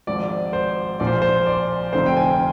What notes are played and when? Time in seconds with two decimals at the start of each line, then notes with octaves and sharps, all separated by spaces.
0.07 G#1 G#2 F3 D5
0.53 C5
1.00 A#1 A#2 F3 D5
1.07 C5
1.22 C5
1.46 D5
1.93 F1 F2 D3 F3 C5
2.06 G5
2.17 G#5